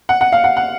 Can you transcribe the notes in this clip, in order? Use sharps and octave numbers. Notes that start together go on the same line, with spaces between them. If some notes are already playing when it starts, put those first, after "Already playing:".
F#5
F#5
F5
F#5
F#5